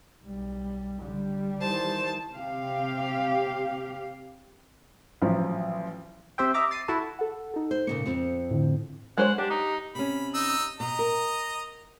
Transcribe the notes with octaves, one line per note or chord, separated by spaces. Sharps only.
B1 G3
D3 G3
D#3 E3 C5 A5
C3 G4 F5
A1 F3 F#3
C4 G4 C5 E5 G5
D#5 E5 A#5 D6
A6 C7 D#7
E4 F#4 A4 A5
A4 F#5
D#4 A4
C5
A#2 C#3 A#3 C#7
F2 C4
A2 D3
G#3 C5 C#5 F#5
D4 G4
D#4
C3 C#4 B5
D#4 E6
B2 D#5 A#5
A#4